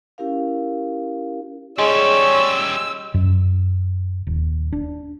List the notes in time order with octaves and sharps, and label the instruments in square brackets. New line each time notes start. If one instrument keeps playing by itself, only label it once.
[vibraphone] C#4 E4 G4 A#4 F5
[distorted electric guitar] G3 C#4 [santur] G#3 [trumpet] C#5 [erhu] E6
[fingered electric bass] F#2
D#1
D4